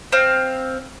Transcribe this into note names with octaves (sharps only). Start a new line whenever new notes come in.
C4 F5